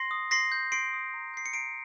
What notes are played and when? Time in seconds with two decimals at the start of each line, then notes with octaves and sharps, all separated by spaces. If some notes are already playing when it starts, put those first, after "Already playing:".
Already playing: C6 A#6 C7
0.11 D#6
0.31 C6 A#6 C7
0.52 G6
0.72 C6 C7 D7
0.93 D#6
1.14 A#5
1.34 G6 C7
1.46 C#7
1.53 A#5 C7 D7